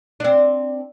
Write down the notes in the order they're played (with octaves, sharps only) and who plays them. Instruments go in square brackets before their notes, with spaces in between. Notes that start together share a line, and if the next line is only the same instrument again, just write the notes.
[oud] C4 D4